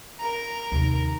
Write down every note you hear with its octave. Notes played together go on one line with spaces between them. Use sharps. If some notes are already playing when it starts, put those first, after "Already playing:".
A#4 A#5
D#2 C3